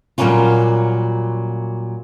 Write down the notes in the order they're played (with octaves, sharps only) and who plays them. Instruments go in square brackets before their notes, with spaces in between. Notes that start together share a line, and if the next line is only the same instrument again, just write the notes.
[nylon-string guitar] A#2 F#3 G3 A#3 C#4 F4